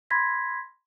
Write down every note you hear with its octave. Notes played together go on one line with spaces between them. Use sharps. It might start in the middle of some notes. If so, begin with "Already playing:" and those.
B5 C6 G#6 A#6 B6